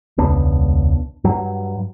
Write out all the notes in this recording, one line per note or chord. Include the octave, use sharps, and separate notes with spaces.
E1 C#2 B3 D4
G2 F#3